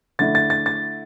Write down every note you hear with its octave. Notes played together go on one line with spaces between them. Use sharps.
D3 A3 E4 A6
A6
A6
A6